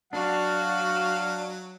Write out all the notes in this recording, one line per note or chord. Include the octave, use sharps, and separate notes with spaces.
F#3 D4 F#4 F5